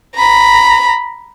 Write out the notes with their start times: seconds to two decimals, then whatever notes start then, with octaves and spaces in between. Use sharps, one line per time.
0.16 A#5 B5